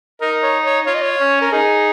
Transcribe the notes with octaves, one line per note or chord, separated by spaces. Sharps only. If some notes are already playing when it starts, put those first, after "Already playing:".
D#4 A#4
C#5
C#5
F4 C#5
D#5
C#5
C#4
A#4
D#4 G#4